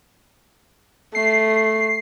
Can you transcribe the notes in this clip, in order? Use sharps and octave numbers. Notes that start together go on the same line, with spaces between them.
A3 C7